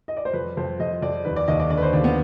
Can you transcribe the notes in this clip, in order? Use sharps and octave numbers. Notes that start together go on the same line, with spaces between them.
D#5
D5
C5
F2 B4
F2 C5
F2 D#5
F2 D5
D#2 B4
D5
D#2 D#5
D5
D3 D5
B4
C5
D#2 D4
B3